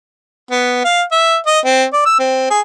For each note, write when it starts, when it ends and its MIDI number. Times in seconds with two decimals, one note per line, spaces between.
0.51 0.79 59
0.84 1.02 77
1.12 1.36 76
1.47 1.59 75
1.65 1.84 60
1.93 2.03 74
2.06 2.19 88
2.19 2.49 60
2.50 2.60 68